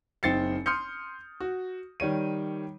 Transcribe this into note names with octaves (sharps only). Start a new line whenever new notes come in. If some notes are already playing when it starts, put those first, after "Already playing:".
F#1 C4 D#4 A6 C7 C#7
C6 D#6 F6 G6 C#7
F#4
D#3 G3 C#5 D#7